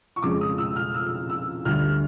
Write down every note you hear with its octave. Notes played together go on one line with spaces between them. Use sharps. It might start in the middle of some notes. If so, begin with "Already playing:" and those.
C#6
F2 C#3 F3 G#3 C#4 D6
D#6
E6
F6
E6
E6
D2 D3 G3 F6